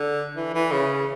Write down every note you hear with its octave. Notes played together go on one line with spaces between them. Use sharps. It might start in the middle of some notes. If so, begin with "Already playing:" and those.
Already playing: D3
E3
E3
C#3